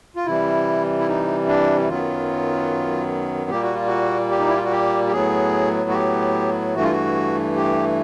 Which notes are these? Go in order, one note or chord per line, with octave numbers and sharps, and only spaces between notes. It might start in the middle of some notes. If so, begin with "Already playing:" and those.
F4
C3 E3 G3 E4
E4
D#4
D4
F#2 D#3 F#3 B3 F4
A#2 G3 A#3 G4
F#4
F4
F#4
G4
D#4
E4
F4
F#4
G4
G4
A2 F#3 B3 G#4
F#4
G4
G2 E3 A3 F#4
F4
F#4
G4